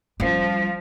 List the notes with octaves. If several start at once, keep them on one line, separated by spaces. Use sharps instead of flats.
F3 G3 C#4